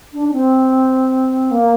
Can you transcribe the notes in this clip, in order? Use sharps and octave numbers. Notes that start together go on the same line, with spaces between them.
D4
D4
C4
A#3